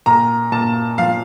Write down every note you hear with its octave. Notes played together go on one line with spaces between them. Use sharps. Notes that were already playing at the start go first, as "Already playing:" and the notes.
A#2 A#5
A#2 A5
F3 F5